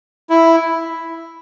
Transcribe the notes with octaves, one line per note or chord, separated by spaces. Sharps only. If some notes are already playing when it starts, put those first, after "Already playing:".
E4